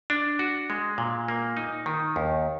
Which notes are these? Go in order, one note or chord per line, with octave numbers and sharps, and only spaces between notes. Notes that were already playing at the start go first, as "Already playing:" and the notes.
D4
F#4
G#3
A#2
A#3
D#4
D#3
D#2